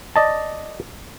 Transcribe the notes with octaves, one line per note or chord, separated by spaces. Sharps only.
D5 D#5 A5